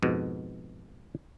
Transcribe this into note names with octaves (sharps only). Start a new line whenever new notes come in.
F2 G#2 B2